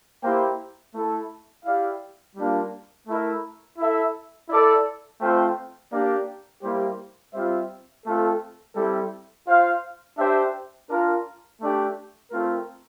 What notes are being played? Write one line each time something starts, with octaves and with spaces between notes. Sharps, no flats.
A#3 E4 G4 C5 G5
A3 E4 A4
E4 G4 D5 F5
G3 A#3 D4 F4
A3 E4 A#4 E5
E4 A4 E5
E4 A4 D5
A3 C4 F4 C5 G5
A#3 D4 G4 D5
G3 A#3 E4 G4 C5
G3 C4 F4 C5 E5
A3 C4 F4 A4
G3 C4 E4 A4 E5
F4 C5 F5
D4 G4 C5 E5
D4 F4 A#4
A3 D4 G4 D5 G5
A3 C4 F4 A#4